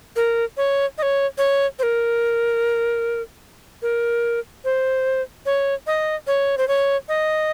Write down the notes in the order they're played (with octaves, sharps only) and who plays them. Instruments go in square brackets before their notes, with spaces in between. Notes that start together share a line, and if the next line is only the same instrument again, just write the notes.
[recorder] A#4
C#5
D#5
C#5
C#5
C5
A#4
A#4
C5
C#5
D#5
C#5
C5
C#5
D#5